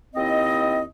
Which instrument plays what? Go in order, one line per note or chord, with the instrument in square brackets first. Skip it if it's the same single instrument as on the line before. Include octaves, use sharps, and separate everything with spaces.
[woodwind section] D#2 C4 E4 D#5